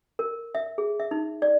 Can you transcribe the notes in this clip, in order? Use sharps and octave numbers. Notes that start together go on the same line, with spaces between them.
A#4
E5
G#4
E5
D#4
D5